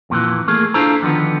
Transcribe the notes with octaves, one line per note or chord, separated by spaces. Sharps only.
F2 A#2 D#3 E3
A3 A#3 G#4
D4 E4 F4 A4 C5 A#5
D3 D#3 F3 B3